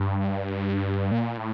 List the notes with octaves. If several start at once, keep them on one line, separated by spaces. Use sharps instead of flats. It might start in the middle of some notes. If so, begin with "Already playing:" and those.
Already playing: G2
A#2
A2